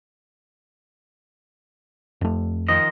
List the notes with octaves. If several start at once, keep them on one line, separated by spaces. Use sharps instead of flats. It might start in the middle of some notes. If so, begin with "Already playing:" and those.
F2 A3
D#3 F3 D#5